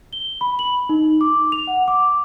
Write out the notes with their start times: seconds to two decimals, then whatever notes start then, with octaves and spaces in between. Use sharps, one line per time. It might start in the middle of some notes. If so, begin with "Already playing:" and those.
0.13 G7
0.41 B5
0.59 F#7
0.89 D#4
1.21 D6
1.52 F7
1.67 F#5
1.88 D6